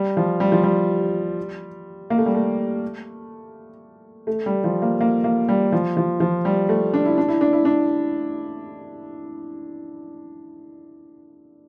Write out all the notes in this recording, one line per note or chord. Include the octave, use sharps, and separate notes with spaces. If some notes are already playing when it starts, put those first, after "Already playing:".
Already playing: G3
F3
G3
F3
G3
A#3
A3
G3
A3
A3
G3
F3
A#3
A#3
A#3
G3
F3
F3
F3
G3
A3
D4
E4
D4
E4
D4
E4
D4